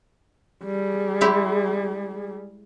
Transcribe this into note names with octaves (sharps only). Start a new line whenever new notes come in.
G3 G#4
G#3 E4 G4